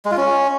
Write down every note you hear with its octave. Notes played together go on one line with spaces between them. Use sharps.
G#3
F4
C#4